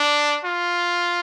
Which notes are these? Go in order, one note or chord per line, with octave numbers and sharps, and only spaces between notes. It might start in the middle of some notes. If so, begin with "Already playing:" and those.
Already playing: D4
F4